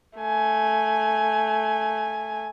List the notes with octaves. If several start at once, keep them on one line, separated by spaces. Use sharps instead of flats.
A3 G#5